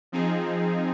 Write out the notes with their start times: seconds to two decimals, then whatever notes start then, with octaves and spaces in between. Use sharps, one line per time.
0.12 F3 C4 D#4 G#4